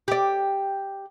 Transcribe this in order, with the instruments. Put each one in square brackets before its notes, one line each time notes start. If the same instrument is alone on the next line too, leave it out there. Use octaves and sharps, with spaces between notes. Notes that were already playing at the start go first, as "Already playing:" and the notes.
[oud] G4 D5